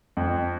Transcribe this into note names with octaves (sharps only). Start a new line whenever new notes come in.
F2